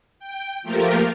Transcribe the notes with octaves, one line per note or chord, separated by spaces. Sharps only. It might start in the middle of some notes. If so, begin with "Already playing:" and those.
G5
F3 A3 A#3 F4 G4 A#4